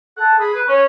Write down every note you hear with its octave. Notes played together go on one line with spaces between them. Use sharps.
A4 F#5
G#4 B5
B4
C#4 C#5